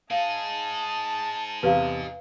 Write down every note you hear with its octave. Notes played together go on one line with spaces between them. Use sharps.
D#4 G#4 F5 A5
E2 C3 B4 C#5 F5